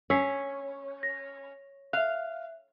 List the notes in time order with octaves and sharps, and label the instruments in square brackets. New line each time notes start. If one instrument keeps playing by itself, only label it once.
[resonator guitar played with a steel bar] C#4 [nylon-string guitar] C#5 [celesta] E6 B6 C7
[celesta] A#6
[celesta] E5 F#6 [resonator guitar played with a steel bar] F5